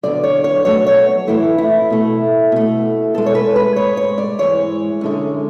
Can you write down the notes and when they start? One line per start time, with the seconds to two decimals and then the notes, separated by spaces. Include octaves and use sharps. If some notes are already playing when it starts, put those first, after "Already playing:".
0.03 E2 D3 F#3 D5
0.23 C#5
0.44 C#5
0.65 B2 F#3 A3 C#5
0.86 C#5
1.27 A2 E3 A3 E4
1.58 E4
1.90 B2 A3
2.52 B2 A3
3.14 B2 G#3 A4
3.26 C#5
3.35 B4
3.56 B4
3.76 G#2 G#3 C#5
3.97 C#5
4.18 D5
4.39 G#2 E3 G#3 C#5
5.01 F#2 D3 G#3